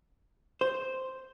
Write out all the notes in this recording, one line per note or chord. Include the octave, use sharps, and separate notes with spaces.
C5